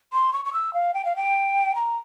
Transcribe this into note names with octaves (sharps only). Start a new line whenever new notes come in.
C6
C#6
C#6
E6
F5
G5
F5
G5
A#5